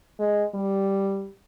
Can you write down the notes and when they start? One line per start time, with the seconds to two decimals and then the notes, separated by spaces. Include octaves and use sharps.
0.20 G#3
0.54 G3